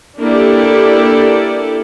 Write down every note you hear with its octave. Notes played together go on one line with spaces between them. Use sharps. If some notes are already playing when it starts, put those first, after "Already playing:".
A#3 D4 E4 G4 A4 D5